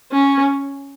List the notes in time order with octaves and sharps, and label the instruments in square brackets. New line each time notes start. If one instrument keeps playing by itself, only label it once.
[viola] C#4